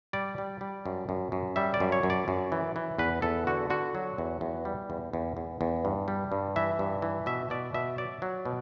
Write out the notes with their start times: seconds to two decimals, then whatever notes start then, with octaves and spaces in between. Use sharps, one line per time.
0.13 G3 D5
0.38 G3
0.61 G3
0.86 F#2
1.09 F#2
1.32 F#2
1.56 G3 E5
1.74 D5
1.80 F#2
1.92 C#5
2.03 F#2
2.10 D5
2.28 F#2
2.52 E3
2.76 E3
2.99 E2 B4
3.22 E2 A4
3.47 D3 F#4
3.70 D3 F#4
3.95 F#3
4.18 E2
4.41 E2
4.65 G3
4.90 E2
5.13 E2
5.37 E2
5.61 E2
5.85 G2
6.08 G3
6.32 G2
6.56 E3 E5
6.79 G2
7.02 E3
7.26 B2 E5
7.50 B2 D5
7.74 B2 E5
7.98 F#3 D5
8.22 F#3
8.45 B2